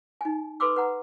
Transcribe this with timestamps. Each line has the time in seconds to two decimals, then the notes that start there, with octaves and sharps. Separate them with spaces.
0.21 D#4 G#5
0.60 A4 B4 B5 C6 D6 E6
0.76 B4 F#5 A#5